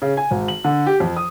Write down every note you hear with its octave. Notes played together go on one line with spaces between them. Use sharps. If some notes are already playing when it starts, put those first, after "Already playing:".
C#3
G#5
G#1
F#7
D3
G4
F2
D#6